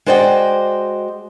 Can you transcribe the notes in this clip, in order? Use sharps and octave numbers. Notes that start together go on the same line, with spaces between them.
G#3 F#4 C5 D5 D#5 G5